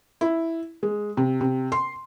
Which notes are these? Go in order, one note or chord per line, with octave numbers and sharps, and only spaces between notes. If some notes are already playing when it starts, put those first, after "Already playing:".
E4
G#3
C3
C3
C6